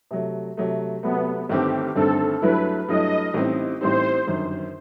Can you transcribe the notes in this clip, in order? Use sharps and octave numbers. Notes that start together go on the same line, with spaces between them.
C3 F#3 A3
C3 F#3 A3
C3 F#3 A3 B3
G1 G2 D#3 A3 C4 G4
G1 G2 D#3 A3 C4 A4
G2 F#3 A3 E4 B4
G2 F#3 A3 E4 D#5
A1 A2 G3 C4 D#4
A1 A2 G3 C4 D#4 C5
G1 F#2 D#3